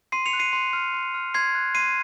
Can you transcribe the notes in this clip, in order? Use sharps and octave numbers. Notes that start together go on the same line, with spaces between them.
C6 C7 D#7
C#7 F7
F#6
C7 D#7
C6
F6
C6
F6
C6 G#6 C7
F#6
C6 C7 D#7